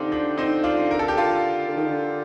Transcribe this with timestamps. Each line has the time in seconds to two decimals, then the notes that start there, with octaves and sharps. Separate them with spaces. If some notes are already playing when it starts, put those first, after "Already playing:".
Already playing: D3 C4 D4 D#4 F4 G4
0.12 D4
0.38 C4 D#4
0.64 D4 F4
0.91 A#4
0.99 A4
1.08 G4
1.17 F4 A4
1.68 D3
1.76 D#3
1.85 D3